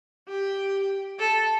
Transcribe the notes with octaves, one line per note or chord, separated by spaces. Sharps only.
G4
A4